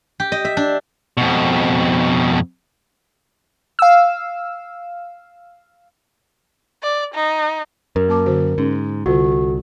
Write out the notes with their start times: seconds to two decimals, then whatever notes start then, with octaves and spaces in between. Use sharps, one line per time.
0.20 G4
0.32 D#5
0.45 E5
0.57 D4
1.17 F2 B2
3.79 F5 E6
6.83 D5
7.15 D#4
7.96 F#2 A#4
8.08 A#3 A5 D6
8.26 D3 F#4 C5
8.58 G#2 C#4
9.06 C2 D3 F4 F#4 A4